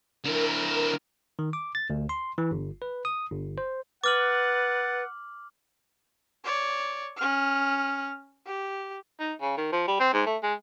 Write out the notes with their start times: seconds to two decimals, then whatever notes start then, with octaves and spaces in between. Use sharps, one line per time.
0.24 D3 E4 A#4
1.39 D#3
1.53 D6
1.75 A6
1.90 D2
2.09 C6
2.38 E3
2.51 G1
2.82 B4
3.05 D#6
3.31 G1
3.58 C5
4.04 B4 F#5 D6 F6 A6 F#7
6.44 C#5 D5
7.16 C#4 F6
8.46 G4
9.20 D#4
9.41 C#3
9.57 D#3
9.72 F3
9.87 G3
10.00 C4
10.13 G#2
10.26 A3
10.43 G#3